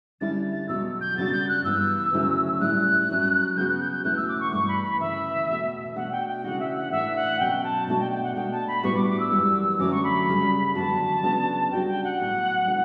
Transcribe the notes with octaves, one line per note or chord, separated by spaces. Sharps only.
D3 G3 C#4 E4 A6
A6
E2 B2 F#3 E6
G6
F#2 C#3 G3 D4 F#4 A6
G6
F#6
G2 E3 B3 E6
D2 C#3 F#3 C#4 E4
A2 G3 C#4 E4 F#6
G2 F#3 C#4
C#3 F#3 B3 F#4 G6
F#6
G6
G6
E2 B2 A3 C#4 E4 F#6
E6
D6
C#6
G2 E3 A3 C#6
B5
B5
D2 C#3 E3 E5
E2 B2 A3
B2 A3 D4 F#4 F#5
G5
G5
C#3 E3 A3 D4 F#4 F#5
E5
F#5
A2 E3 A3 D4 E5
F#5
B2 F#3 C#4 F#4 G5
A5
B2 A3 D4 F#4 A5
G5
G5
F#5
B2 A3 D4 G5
A5
B5
A2 G3 B3 D4 F#4 C#6
D6
D6
E6
F#2 E3 G3
D3 F#3 A3 C#4 F#4 D6
C#6
B5
F#2 C#3 G3
E2 D3 F#3 B3 F#4 A5
C#3 F#3 B3 D4 F#4
C#3 G3 D4 F#4 G5
G5
F#5
A2 F#3 B3
C#3 E3 A3 D4 F#4